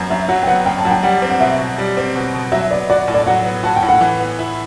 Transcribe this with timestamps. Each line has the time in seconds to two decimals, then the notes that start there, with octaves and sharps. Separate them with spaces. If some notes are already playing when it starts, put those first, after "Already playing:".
Already playing: F#2 F#3 B3
0.10 F#2 E5
0.28 F#3 F#5
0.43 G5
0.47 B3 F#5
0.66 F#2 G5
0.78 A5
0.85 F#2 F#5
0.91 G5
1.03 G3 F#5
1.22 C4
1.30 F#5
1.40 B2 E5
1.59 B2
1.78 G3
1.97 C4
2.15 B2
2.34 B2
2.52 F#3 E5
2.71 B3 D5
2.90 F#4 D5
3.08 A2
3.14 D5
3.27 F#3 F#5
3.45 B3
3.63 F#4 A5
3.76 G5
3.83 A2
3.89 F#5
4.01 E3
4.19 B3
4.39 E4